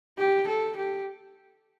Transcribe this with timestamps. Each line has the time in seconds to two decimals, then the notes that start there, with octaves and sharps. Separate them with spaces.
0.18 G4
0.48 A4
0.77 G4